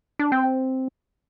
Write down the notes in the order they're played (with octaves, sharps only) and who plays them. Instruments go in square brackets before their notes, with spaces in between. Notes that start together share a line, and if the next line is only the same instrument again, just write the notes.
[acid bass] D4
[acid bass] C4 [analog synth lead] G5